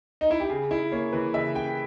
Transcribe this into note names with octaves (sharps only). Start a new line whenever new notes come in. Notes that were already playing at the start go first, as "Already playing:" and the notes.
D#4
E4
G4
C#3 G#4
C#3 E4
A#3 C#5
E3 B4
C#3 E5
C#3 G5